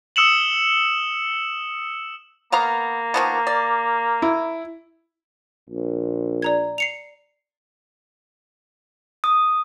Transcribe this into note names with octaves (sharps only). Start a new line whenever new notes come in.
D#6 E6 C#7 E7 F#7
A#3 B3 F5 A#5
D#3 F3 B3
D5
E4
A#1
D5 A#5 G#6
C7 C#7 F7
D#6